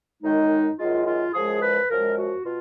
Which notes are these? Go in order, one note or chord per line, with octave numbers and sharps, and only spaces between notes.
F#2 D#3 G#3 D#4
F#2 D#3 G#3 F4
F4
F#2 F3 G#3 G#4
B4
F#2 F3 G#3 A#4
F#4
B2 F4